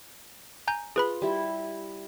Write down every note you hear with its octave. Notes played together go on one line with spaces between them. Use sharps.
G#5 A#5 G6
F4 G#4 B4 B5
G3 E4